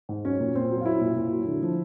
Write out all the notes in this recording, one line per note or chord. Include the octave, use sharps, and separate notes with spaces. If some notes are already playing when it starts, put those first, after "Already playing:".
G#2
F#3 C#4
A#2
A#2 C4
F#3
F4
F#3 E4
A#2
A#2
F#3
D3
F3